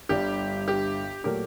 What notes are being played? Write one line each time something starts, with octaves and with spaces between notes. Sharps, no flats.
G1 G2 D3 G3 G4
G4
A#2 F#3 A3 G4 A#4